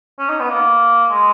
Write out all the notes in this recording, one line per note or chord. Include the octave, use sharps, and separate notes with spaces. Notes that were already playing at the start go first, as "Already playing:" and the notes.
C#4
D#4
B3
A#3
G#3